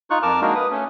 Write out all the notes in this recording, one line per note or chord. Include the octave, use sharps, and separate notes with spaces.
D#4 F4 C#6 F#6
F2 A#4 A5 D6 F6
G#3 A#3 D4 D#4 F#4 A#4
B4 D#6
A3 C#4